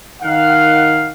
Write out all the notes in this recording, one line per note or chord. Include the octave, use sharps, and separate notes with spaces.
D#3 F5 F#5